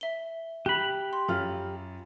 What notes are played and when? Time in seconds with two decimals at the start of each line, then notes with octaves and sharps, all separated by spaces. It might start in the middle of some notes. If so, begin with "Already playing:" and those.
0.01 E5 G7
0.66 G4 B5 F#6
1.13 C6
1.28 F#2 F4 A4 F6